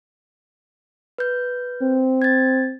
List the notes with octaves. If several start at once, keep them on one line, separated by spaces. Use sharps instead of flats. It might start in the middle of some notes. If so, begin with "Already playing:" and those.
B4 G6
C4
G#6 A6